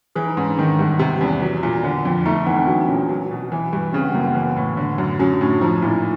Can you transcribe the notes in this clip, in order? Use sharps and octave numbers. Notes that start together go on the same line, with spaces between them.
E3 G#4
D#4
G#2 C#4
D4
D#3 C#4
G2 B3
C3 B3
E2 C#4
F#3
A#2
D3
F2
A3 D#4
E3 B3
C4
F#3 D4
A#2 C#4
F#3
B2
E3
G2
C#3 C4
B3
F#2 A#3
B3
E3
A2
D3
F#2
F#3 C#4
D4
A2 C#4
F3 D#4
A#2 E4